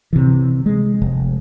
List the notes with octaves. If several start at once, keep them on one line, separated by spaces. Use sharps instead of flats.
C3 E3
G#3
F1